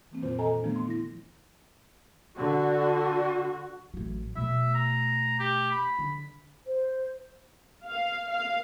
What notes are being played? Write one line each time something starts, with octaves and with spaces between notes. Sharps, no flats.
E3 A#3 C4
F2 A#2 D#3 F#3 F4 C5
A4 D#5 G#5 A#5
D#3 F3 A3 B3 D4
C6
E4 A#6
D3 F#4
A1 F#3
B2 A3 E5
A#5
G4
B5
D3
C5
F5
F5